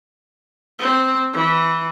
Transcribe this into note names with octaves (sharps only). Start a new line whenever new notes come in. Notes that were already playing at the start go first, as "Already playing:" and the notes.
C4
E3